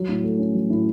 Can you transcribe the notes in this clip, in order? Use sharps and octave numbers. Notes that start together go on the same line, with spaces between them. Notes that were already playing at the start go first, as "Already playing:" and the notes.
Already playing: F#3
A2
A3
C#4
F#3
A2